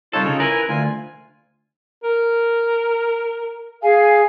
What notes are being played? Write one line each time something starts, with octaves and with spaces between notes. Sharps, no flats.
C2 D#4 F4 A4 C#5
C#3
E4 A#4 B4 G#5 F#6
D2 F4 G#5
A#4
G#4 F5 G#5